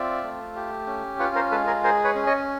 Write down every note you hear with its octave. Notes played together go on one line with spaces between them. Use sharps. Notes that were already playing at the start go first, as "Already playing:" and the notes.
Already playing: C4 F4 D5 E5
A3
G4
C#4
F4 B4 C#5
A#4 C5
G#3 A4 B4
G#4 A#4
G#4 A#4 C5
B4 C#5
C#4
C#5 D#5